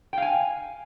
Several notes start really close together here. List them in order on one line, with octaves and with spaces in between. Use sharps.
G5 F5 G#5